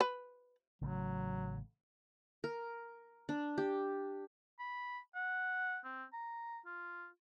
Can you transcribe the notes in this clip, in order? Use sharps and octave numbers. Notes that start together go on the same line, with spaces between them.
B4
A1 C#3 F#3 A3
A#4
D4
G4
B5
F#5
C4
A#5
F4